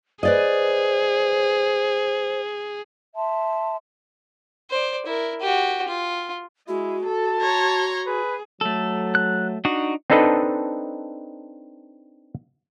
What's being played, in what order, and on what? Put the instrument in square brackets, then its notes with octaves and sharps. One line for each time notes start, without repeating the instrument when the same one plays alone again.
[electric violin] G#4 [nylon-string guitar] B4 D5 D#5 [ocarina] C5
[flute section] E5 A5 C6
[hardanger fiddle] C5 D5
E4 A#4
F#4 G4
F4
[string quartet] G#3 [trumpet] E4 [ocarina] F#4
[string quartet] A4 [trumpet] A5
[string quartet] C#5 A#5 C6
[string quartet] G#4 [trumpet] B4
[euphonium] F#3 [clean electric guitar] A3 A4
[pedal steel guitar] F#6
[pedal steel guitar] D4 D#4 [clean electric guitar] F#4
[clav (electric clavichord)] C4 D4 D#4 A4 B4 D#5